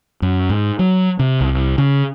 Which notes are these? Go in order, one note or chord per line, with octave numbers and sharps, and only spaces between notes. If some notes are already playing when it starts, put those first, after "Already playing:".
F#2
G#2
F#3
C3
C2
C#3